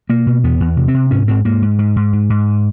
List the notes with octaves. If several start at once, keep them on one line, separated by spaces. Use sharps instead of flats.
B2 A#3
B2
E2 B3
E2
C3
C4
C3
G#2 C#4
G#2 C4
G#2 A#3
G#2
G#2
G#2
G#2
G#2